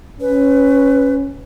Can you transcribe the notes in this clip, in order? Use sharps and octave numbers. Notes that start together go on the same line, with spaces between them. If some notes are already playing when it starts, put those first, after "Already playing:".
C#4 B4